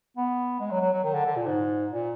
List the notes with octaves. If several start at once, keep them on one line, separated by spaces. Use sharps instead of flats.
B3
G#3
F#3
F#3
F#3
D#3
D3
D3
A#2
G#2
A#2